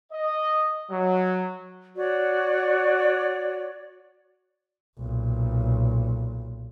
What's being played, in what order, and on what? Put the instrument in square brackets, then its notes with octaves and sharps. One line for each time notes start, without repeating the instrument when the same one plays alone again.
[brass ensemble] D#5
F#3
[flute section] F#4 C#5 D5
[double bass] B1 A#2